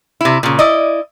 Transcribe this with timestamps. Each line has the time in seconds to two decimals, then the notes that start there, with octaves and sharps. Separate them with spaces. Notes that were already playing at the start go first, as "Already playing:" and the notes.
0.21 C3 E4
0.43 A#2 C#3
0.59 E4 D5 D#5